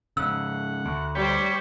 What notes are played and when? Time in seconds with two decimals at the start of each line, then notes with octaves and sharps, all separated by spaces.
0.17 G#2 C#3 F#5 E6
0.85 D2
1.15 G3 C5 C#5 G5 B5